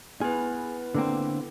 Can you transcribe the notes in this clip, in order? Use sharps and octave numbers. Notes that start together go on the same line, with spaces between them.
B3 E4 G#4 B4
D3 A#3 C4